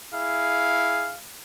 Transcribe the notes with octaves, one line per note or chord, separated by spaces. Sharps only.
E4 G#4 F5